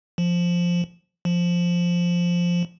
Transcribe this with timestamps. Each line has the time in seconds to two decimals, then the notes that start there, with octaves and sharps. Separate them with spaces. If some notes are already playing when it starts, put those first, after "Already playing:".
0.18 F3
1.25 F3